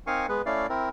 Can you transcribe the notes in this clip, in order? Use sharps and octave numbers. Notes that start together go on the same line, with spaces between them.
C4 D#4 A#4 F5 G#5 C#6
G#3 B3 B4
A3 C#4 E4 D5 F5
C4 E4 A#4